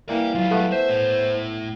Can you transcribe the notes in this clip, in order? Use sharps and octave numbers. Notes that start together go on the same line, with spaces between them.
E3 A#3 D5 G5
F#3 G3 F4
A3 B3
C5 E5
A2